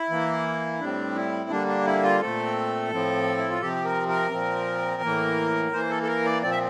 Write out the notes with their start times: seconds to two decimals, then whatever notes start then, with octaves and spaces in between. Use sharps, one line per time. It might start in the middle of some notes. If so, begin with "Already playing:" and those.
Already playing: E4
0.10 E3 A#3
0.80 A2 G3 C4 D4
1.15 E4
1.50 D3 G3 A#3 D4
1.67 D4
1.85 E4
2.03 F4
2.21 A#2 A3 C4 A4
2.91 A2 F3 C4
3.37 E4
3.50 F4
3.61 C3 F3 C4 G4
3.85 A#4
4.08 A#4
4.32 A#2 F3 C4
5.02 A2 E3 A#3
5.72 E3 A#3 C5
5.90 A4
6.03 A4
6.08 A#4
6.26 D5
6.43 A#2 F3 C4 D5
6.51 E5